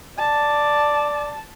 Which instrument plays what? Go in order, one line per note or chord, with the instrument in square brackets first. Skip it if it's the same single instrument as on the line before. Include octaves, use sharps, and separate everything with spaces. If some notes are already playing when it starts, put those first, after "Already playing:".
[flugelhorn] D5 [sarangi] A5